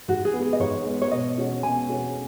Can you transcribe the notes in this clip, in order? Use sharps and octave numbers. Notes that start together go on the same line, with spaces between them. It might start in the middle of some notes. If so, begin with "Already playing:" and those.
G#2 F#4
G#4
B3
G#3 G#4
D#5
G#2 C#5
G#3 B3
C#5
B2 D#5
G#3 C#4 F#4 C#5
B2 G#5
G#3 C#4 F#4 C#5